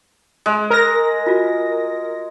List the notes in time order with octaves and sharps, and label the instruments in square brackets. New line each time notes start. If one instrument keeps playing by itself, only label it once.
[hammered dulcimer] G#3
[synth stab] A#4 A#6
[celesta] F4 F#4